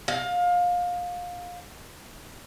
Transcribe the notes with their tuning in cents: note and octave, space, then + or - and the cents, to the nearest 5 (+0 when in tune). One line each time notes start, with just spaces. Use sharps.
F5 +25